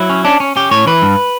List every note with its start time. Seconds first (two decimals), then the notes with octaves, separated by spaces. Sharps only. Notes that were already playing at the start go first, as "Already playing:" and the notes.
Already playing: F#3 E4
0.10 C#4
0.25 C#4 D4
0.40 C#4
0.56 C#4 G4
0.71 A2 C#5
0.87 E3 B4
1.02 G2